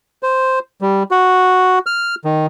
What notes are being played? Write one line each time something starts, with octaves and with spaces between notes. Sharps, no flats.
C5
G3
F#4
F6
D#3